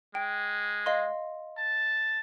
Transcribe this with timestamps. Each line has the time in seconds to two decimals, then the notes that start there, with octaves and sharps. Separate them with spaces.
0.15 G#3 G5
0.86 D#5 F5 C6
1.58 A5